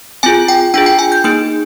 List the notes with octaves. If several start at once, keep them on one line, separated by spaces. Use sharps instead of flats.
C4 F4 G#4 G#5
G5
D4 F4 G#4 G5
G5
G#5
G6
A#3 D#4 G#4 G6